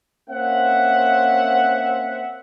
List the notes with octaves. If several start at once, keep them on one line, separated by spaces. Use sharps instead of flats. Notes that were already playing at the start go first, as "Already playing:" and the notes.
A#3 C4 C#4 E5 F#5